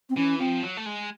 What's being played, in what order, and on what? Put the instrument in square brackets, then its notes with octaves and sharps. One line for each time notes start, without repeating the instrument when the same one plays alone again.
[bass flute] C4
[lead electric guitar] E3 [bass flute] C#4
[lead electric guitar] F3 [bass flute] C4
[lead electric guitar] F#3
A3
G#3